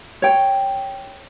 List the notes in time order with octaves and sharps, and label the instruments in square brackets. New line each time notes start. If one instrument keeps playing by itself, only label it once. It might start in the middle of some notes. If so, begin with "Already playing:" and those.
[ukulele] C#5 G5